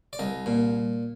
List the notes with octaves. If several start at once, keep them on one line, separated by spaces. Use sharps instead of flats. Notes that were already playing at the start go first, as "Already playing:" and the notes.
D5
C2 D#5
A#2